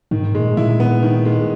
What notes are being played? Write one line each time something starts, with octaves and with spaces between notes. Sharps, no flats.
G#2 D#3
A#2 G#3
A#2 E4
B3
D#3
G#3